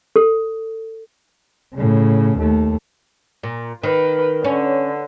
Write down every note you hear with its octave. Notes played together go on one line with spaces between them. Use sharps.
A4
A2 C#3
D#2 A3
A#2
D#3 B4
D3 C#4